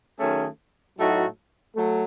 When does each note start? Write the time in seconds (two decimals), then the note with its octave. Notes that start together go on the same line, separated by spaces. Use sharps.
0.18 D#3 F#3 A3 C#4 G#4
0.98 A2 F#3 A3 D#4 F#4
1.76 F#3 A3